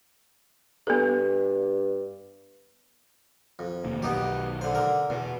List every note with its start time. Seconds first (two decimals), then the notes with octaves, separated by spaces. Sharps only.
0.87 G2 B3 A4
3.59 F2
3.84 F1 D#2 A#2
4.03 B1 D#3 F#3 B3 D#4 G4
4.61 D3 C5
4.75 D3 A#4
5.10 E2 B2